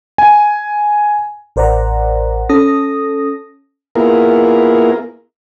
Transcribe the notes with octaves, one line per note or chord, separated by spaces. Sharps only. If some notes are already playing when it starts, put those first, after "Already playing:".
G#5
A1 A#4 C5 D5 F#5 A#5
C#4 A4 D#6 A#6
A#3 B3 E4 F4 G#4 A#4